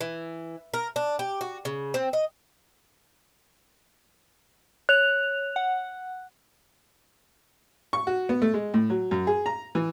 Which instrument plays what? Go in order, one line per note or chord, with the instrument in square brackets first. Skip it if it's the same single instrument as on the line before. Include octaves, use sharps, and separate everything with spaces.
[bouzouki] E3
A#4
D4
G4
F#4
C#3
C4
D#5
[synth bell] C#5 F7 [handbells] F#6
[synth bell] F#5
[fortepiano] C#6
F#4
B3
A3
G#3
A2
F#3
F#2
G#4
A#5
E3